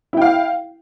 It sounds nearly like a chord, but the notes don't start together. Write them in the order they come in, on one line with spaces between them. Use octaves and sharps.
E4 G5 F5